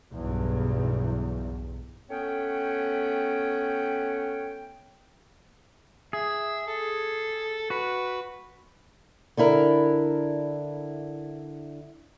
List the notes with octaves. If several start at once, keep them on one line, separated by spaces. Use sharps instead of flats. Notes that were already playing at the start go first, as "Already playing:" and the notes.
B1 E2 G2
A3 B3 C#4 C#5 G5
G#4 E5
A4
F#4 B4
D3 D4 E4 A#4